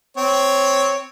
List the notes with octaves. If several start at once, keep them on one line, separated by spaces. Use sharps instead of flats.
C4 C#5